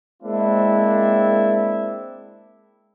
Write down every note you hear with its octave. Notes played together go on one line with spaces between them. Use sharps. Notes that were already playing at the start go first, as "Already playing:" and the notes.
G#3 A#3 C4 D4 E4